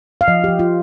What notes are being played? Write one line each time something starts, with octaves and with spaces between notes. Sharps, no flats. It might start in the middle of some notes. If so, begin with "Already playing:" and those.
F5
F3 D#5
F3 G4
F4